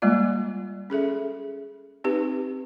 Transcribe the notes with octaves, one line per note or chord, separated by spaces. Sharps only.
G3 G#3 A#3 F4 D5
C#4 G#4 A4 E5
C4 D#4 G4 B4